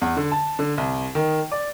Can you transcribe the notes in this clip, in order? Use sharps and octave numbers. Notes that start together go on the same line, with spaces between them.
E2
D3
A5
D3
C2
D#3
D5